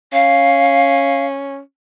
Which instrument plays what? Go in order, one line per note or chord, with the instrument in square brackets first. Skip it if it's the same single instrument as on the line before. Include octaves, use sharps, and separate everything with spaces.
[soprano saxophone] C#4 [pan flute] F5